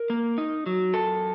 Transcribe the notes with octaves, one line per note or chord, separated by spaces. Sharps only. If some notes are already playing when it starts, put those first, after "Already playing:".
Already playing: A#4
A#3
D#4
F#3
F#2 A4